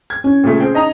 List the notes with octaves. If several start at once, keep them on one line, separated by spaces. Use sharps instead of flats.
G#6
C#4
A#2 C#3 A3
C4 G#4 G5
D#4 D#5 A#5